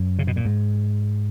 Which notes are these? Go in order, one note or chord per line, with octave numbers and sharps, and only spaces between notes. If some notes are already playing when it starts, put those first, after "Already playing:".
Already playing: F#2
C#3
B2
A#2
G#2